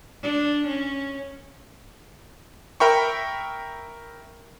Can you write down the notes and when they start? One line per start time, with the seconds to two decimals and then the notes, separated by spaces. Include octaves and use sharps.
0.23 D4
0.67 C#4
2.80 A#4 E5 G5 B5 C#6